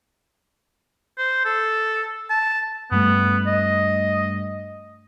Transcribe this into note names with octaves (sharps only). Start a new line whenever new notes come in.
C5
A4
A5
G2 G3 A3 B3
D#5